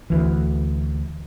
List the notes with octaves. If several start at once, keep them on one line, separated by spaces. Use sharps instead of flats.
D2 E3